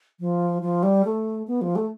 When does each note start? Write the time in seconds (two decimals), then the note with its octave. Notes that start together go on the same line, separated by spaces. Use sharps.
0.20 F3
0.62 F3
0.83 G3
1.05 A3
1.48 B3
1.61 F3
1.76 A3